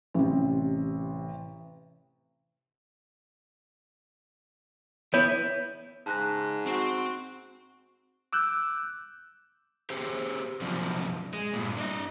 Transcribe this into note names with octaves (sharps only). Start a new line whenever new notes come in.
A1 C3
B3 E4 C#5
G#2 C#3 A5 F#6 A#6
C4 F#4
D6 E6 F#6 G6
G4 G#4 C5
F#2 C3 F3 D4
G#3
G2 A#2
D4 D#5